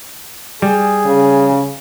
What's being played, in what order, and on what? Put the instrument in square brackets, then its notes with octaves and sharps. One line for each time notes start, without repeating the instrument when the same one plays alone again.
[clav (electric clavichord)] G3 [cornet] G#4
[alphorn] C#3